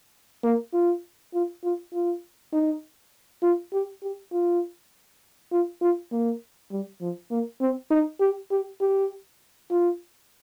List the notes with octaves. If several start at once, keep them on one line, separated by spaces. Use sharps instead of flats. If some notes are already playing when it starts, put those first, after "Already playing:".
A#3
F4
F4
F4
F4
D#4
F4
G4
G4
F4
F4
F4
A#3
G3
F3
A#3
C4
D#4
G4
G4
G4
F4